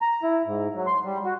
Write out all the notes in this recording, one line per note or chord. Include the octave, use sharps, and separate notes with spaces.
A#5
E4
G#2
F#3
C6
G3
F#4